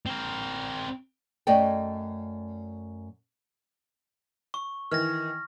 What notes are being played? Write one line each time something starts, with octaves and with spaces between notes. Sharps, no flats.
C4 A#4
F#2 A3 D5 D#5 G5
C#6
D#3 E3 F6 A#6